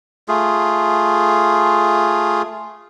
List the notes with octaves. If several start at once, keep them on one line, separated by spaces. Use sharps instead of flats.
A3 F4 G#4